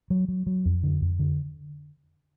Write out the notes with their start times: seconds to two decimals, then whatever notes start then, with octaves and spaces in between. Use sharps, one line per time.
0.10 F#3
0.28 F#3
0.47 F#3
0.65 F2
0.83 D3
1.01 F2
1.19 D3